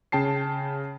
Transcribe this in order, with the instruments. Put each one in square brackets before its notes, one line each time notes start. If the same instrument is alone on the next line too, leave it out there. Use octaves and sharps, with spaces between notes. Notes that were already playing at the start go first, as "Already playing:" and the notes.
[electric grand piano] C#3 G5 A5 C7